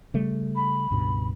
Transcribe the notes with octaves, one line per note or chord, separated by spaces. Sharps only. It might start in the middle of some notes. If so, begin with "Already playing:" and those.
C#3 G3 A3
B5
C#2 G2 B2